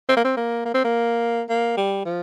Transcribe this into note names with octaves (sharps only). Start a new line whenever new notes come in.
C4
A#3
C4
A#3
A#3
C4
A#3
A#3
G3
F3